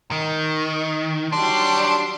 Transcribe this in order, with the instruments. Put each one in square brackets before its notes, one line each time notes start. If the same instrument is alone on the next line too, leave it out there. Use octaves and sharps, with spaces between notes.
[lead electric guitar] D#3
[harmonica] F#3 G3 C6 [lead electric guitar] D4